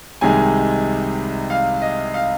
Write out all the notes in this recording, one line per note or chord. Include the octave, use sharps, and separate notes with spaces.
C2 C3 D#3 G#3 G#5
F5
D#5
F5